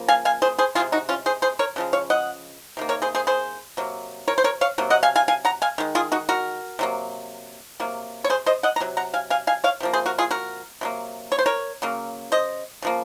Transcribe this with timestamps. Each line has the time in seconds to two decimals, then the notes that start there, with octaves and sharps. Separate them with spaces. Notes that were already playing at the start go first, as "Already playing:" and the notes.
Already playing: C#3 F3 A#3
0.08 F5 G#5
0.25 F5 G#5
0.42 G#4 C5
0.58 G#4 C5
0.75 D#3 G#3 F4 G#4
0.80 C3
0.92 D#4 F#4
1.09 C#4 F4
1.26 G#4 C5
1.42 G#4 C5
1.59 A#4 C#5
1.76 C#3 F3 G#3
1.93 C#5 F5
2.10 D#5 F#5
2.77 C3 D#3 A#3
2.89 A#4 C#5
3.02 G#4 C5
3.15 G#4 C5
3.27 G#4 C5
3.77 C3 F#3 A#3
4.28 A#4 C#5
4.38 C5
4.44 A#4 C#5
4.61 C#5 F5
4.78 C3 F#3 A#3
4.90 D#5 F#5
5.03 F5 G#5
5.16 F5 G#5
5.28 F5 G#5
5.45 F#5 A#5
5.62 F5 G#5
5.78 D#3 G#3
5.95 F4 G#4
6.12 D#4 F#4
6.29 F#4 A#4
6.79 C3 F#3 A#3
7.80 C3 F#3 A#3
8.24 C#5
8.30 G#4 C5
8.46 C5 D#5
8.63 D#5 F#5
8.76 A#5
8.80 C3 F#3
8.97 F#5 A#5
9.14 F5 G#5
9.30 F5 G#5
9.47 F5 G#5
9.64 C#5 F5
9.80 C3 F3 A#3
9.93 G#4 C5
10.06 F#4 A#4
10.18 F4 G#4
10.31 F#4 A#4
10.81 C3 F#3 A#3
11.32 C#5
11.39 C5
11.46 A#4 C#5
11.82 C#3 F#3 A#3
12.32 C5 D#5
12.82 C#3 F3 A#3